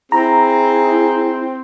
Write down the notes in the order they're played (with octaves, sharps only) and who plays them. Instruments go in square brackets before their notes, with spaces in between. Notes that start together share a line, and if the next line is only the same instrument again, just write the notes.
[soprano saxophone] C4 [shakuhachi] E4 [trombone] G#4 [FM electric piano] A#5